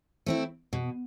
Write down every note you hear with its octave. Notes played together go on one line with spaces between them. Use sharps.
A3 C4 E4
B2